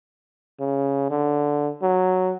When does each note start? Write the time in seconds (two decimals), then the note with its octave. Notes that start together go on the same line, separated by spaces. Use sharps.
0.60 C#3
1.10 D3
1.82 F#3